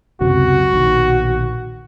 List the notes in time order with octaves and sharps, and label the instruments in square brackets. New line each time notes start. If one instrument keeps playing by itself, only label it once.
[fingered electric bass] C#2 F#2 C3 [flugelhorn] F#4
[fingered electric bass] A#1 B2 D#3